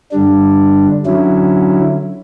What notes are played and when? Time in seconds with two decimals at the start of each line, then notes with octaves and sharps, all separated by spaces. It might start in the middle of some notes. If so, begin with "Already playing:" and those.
0.11 G2 D3 G3 D4
1.06 D3 F#3 C#4 E4